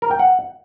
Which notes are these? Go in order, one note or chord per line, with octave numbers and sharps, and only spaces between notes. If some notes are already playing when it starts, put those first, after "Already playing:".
A#4
G5
F#5